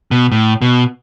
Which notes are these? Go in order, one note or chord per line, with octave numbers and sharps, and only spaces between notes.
B2
A2
B2